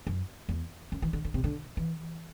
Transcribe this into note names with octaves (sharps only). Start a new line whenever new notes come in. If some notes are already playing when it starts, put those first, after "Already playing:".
F#2
E2
F#2
E3
D3
D3
C3
D3
E3